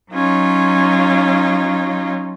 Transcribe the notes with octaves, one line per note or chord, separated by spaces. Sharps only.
F#3 C#4 D#4 F4